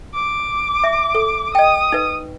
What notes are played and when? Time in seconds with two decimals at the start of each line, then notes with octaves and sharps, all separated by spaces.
0.14 D6
0.84 E5
1.15 A4
1.55 D#5 G5 D#6
1.92 D#4 B4